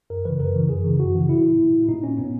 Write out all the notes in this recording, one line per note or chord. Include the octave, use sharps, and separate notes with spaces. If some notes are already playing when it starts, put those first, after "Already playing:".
F#2 A#4
C#3 E3 B4
F#2 A#4
C#3 E3
F#2 G#4
C#3 E3
F#2 F#4
C#3 E3
A#2 E4
A#2
A#2 D#4
C#4
A#2 B3